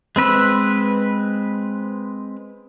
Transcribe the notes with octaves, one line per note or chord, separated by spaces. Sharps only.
G#3 C4 B4 E6